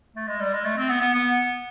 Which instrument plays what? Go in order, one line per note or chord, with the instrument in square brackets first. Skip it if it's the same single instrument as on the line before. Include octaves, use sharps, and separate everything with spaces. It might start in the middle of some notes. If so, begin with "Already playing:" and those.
[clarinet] A3
G#3
G3
G#3
A3
C4
B3
B3
B3